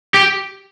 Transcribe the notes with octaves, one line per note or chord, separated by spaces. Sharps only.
G4